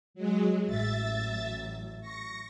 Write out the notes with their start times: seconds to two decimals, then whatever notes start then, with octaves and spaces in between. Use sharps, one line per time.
0.14 F#3 G#3
0.66 A1 A2 F#3 E5 A6
2.01 C#6 A#6